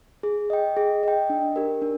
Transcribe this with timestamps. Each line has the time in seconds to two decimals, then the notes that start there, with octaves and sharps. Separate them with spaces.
0.23 G#4
0.50 D#5 G5
0.77 G#4
1.03 D#5 G5
1.30 D4
1.56 G4 A#4
1.82 D4